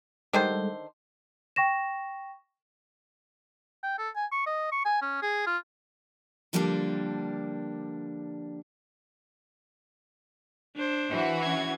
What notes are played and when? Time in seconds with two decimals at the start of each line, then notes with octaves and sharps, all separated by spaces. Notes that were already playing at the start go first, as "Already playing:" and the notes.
0.33 D3 D#3 G3 G#3 A4 C5
1.56 G5 C#6 A#6 E7
3.83 G5
3.98 A4
4.16 G#5
4.32 C#6
4.47 D#5
4.72 C#6
4.85 G#5
5.02 C#4
5.22 G#4
5.47 F4
6.53 D3 F3 G3 A#3 C4 D4
10.75 D4 C5
11.10 E3 F#4
11.43 C#4 G#6